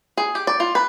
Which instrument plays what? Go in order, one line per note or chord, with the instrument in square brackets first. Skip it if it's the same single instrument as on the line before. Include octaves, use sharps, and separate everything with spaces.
[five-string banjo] G#4
G4
D5
F4
B4